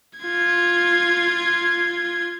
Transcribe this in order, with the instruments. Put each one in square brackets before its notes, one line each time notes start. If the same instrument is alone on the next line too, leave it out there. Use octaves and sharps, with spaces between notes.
[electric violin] F4 G#6